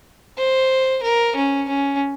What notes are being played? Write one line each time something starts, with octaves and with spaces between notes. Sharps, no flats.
C5
A#4
C#4
C#4